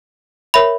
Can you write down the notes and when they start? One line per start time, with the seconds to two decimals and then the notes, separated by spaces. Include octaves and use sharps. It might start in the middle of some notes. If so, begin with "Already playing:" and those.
0.54 A#4 C#5 E5 B5